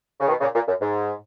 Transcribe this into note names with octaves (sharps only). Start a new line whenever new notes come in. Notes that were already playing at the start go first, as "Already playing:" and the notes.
C#3
B2 D#3
A#2 C#3
A#2
F#2
G#2